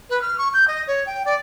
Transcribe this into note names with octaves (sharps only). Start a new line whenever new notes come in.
B4
F6
C#6
G6
D#5
C#5
G5
D5